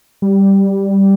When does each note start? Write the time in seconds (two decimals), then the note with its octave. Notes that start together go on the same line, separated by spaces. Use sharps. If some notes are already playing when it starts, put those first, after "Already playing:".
0.22 G3